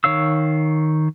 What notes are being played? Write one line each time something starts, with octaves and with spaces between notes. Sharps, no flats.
D#3 C#5 F5 E6